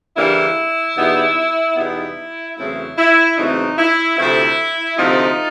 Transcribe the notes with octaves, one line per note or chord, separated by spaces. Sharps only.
C#3 E3 G3 A#3 D4 E4
E2 B2 G3 B3 D#4
E2 B2 G3 B3 D#4 E4
E2 C#3 F#3 A3 C4 E4
E4
E2 C#3 F#3 A3 C4 D#4
E4
D2 C3 F3 A3 C4 E4
D2 C3 F3 A3 C4 D#4 F4